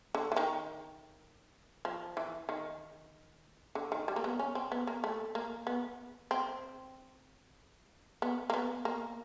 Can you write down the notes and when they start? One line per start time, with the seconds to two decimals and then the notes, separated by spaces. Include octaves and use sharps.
0.15 D3
0.32 E3
0.36 D#3
1.85 F3
2.17 E3
2.49 D#3
3.75 D3
3.92 D#3
4.08 G3
4.16 A#3
4.24 B3
4.39 C#4
4.55 C4
4.72 B3
4.87 A#3
5.04 A3
5.35 A#3
5.67 B3
6.31 C4
8.22 B3
8.50 A#3
8.54 B3
8.85 A#3